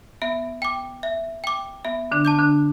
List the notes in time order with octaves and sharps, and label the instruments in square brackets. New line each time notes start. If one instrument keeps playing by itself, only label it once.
[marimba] B3 [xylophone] E5
[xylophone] G5 D6
E5
G5 D6
[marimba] B3 [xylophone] E5
[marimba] D3 D4
[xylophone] A5 D6 G6
[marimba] D3 D4